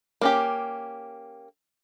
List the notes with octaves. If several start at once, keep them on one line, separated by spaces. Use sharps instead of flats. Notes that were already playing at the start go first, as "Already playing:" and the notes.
A#3 C#4 G4